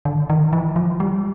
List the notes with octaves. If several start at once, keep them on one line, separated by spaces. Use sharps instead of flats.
D3
D#3
E3
F3
G3